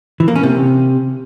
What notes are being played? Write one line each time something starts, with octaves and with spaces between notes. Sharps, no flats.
E3
A#3
C#4
C3